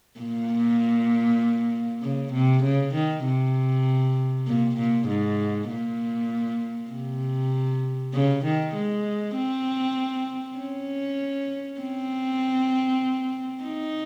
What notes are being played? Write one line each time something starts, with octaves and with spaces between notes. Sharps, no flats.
A#2
C#3
C3
C#3
D#3
C3
A#2
A#2
G#2
A#2
C3
C#3
D#3
G#3
C4
C#4
C4
D#4